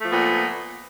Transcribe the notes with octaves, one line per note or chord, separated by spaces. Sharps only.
A#2 F3 A3 B3